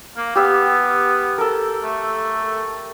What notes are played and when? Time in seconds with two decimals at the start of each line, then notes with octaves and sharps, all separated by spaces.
0.17 A#3
0.35 B3 G4 E5 F5
1.38 A4 A#4
1.83 A3